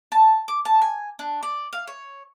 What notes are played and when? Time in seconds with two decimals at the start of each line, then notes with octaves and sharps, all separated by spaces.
0.12 A5
0.48 D6
0.65 A5
0.82 G#5
1.19 D4
1.43 D5
1.73 F5
1.87 C#5